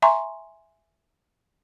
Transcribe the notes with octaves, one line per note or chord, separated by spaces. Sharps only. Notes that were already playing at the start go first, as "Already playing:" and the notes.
E5 G#5 A#5 C6 C#6